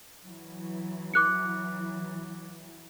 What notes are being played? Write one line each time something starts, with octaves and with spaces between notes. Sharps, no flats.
E3 F#3
D6 F#6 C#7